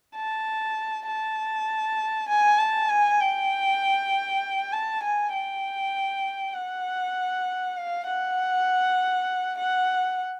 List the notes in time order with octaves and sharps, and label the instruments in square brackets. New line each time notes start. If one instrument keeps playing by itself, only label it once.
[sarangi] A5
A5
G#5
A5
G#5
G5
A5
G#5
G5
F#5
F5
F#5
F#5